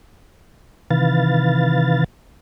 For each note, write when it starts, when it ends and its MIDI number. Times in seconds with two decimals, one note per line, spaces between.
0.91 2.04 48
0.91 2.04 51
0.91 2.04 52
0.91 2.04 71
0.91 2.04 77
0.91 2.04 93